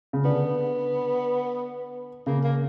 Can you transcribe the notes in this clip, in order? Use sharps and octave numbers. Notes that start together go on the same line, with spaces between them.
C#3
D3 B3
C#3 A#3
A#3